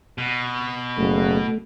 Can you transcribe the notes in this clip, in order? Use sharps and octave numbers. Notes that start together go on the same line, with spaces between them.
B2
F#1 A3